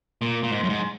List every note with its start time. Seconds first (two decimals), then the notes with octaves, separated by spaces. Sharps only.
0.22 A#2
0.43 A#2
0.51 G#2
0.63 F#2
0.70 G#2